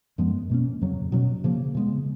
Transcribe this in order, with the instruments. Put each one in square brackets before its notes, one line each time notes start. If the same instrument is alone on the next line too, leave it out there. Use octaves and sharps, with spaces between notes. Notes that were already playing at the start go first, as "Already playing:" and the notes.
[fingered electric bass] F#2 F3 G#3 B3
B2 A#3 C#4
F2 C#3 F#3
B2 F#3 C#4
C#3 F3 A#3
C#3 G#3 B3